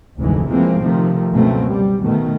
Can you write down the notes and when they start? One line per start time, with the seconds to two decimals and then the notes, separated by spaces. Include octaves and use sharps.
0.19 F1 D2 G#2 E3 G#3
0.49 E3 F3 G#3 A#3 C4
0.81 C3 D#3 F3 A3
1.31 C#2 F#2 B2 A3 A#3 C4
1.66 G3
2.01 B2 D#3 A3